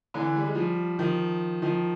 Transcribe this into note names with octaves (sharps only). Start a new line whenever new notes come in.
D3 E3
G3
G#3
F3 G3
D#3 F3
D#3 F3